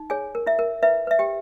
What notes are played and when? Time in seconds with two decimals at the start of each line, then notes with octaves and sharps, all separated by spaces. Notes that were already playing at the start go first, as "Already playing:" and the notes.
Already playing: D#4
0.10 G#4 C#5 G#5
0.35 A#4
0.46 E4 E5
0.59 A#4
0.83 E4 B4 E5
1.07 B4 E5
1.19 G4 G5